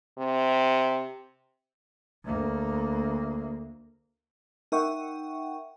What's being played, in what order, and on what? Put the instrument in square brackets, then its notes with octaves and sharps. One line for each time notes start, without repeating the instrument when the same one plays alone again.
[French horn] C3
[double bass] D2 A#3
[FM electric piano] D#4 A#4 E5 F#5 G5 C#6